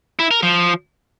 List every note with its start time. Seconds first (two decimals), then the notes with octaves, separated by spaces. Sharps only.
0.19 E4
0.31 A#4
0.43 F3